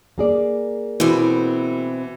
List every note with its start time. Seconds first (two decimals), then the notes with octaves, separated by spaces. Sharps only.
0.18 A#3 G#4 D5
1.00 B2 E3 C4